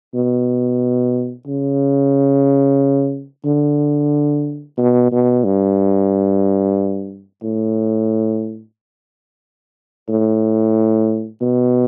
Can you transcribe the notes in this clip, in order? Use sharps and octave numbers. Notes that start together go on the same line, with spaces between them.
B2
C#3
D3
B2
B2
G2
A2
A2
B2